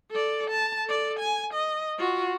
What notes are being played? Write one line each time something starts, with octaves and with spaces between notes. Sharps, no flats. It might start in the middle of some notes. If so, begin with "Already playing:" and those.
A4 D5
A5
A4 D5
G#5
D#5
F4 F#4